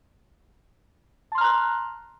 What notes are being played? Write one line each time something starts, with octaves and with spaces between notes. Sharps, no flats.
A5 A#5 C6 F6 F#6